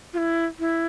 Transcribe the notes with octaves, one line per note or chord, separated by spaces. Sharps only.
F4
E4
E4